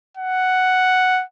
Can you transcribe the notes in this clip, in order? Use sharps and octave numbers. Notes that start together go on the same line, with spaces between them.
F#5